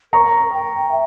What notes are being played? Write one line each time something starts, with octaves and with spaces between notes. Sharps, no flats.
A#4 A#5 C#6
G5
E5